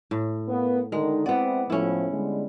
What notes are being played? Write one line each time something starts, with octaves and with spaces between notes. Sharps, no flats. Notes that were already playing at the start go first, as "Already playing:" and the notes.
A2
A#3 B3
D3 D#3 G#3
B3 C4 E4 D5 F#5
A2 F3 C#4 E4
D3 G3 G#3